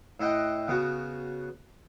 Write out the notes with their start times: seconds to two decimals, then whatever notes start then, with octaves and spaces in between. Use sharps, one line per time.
0.20 A2 E4 D#5 F#5 G5
0.68 C#3 B3 F#4